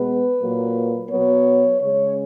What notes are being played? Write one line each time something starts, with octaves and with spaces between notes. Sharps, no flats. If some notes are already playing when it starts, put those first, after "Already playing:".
Already playing: B2 G#3 B3 B4
A#2 F#3 A#3
B2 F#3 B3 C#5
C#3 G#3 C#4 C#5